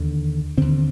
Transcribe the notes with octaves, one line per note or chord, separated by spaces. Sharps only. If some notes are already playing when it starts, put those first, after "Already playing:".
Already playing: D#2 D3 D4
D#2 D3 C4